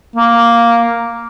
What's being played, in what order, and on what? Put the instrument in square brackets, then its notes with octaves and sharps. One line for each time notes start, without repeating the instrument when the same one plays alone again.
[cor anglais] A#3